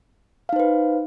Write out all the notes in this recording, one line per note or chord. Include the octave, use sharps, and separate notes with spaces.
D#4 B4 C5 F5